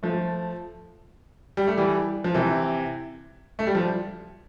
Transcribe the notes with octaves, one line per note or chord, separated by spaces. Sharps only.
F3 A3
G3
A3
E3 G3
F3
C3 E3
A3
G3
F3